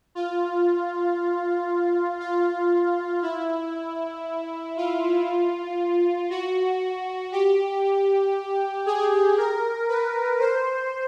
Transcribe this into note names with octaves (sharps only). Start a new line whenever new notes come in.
F4
F4
E4
F4
F#4
G4
G#4
A#4
B4
C5